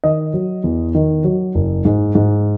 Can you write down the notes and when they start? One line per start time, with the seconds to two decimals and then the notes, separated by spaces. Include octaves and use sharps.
0.04 D#3 D#5
0.34 F#3
0.64 E2
0.95 D#3
1.24 F#3
1.55 F#1
1.85 G#2
2.15 G#2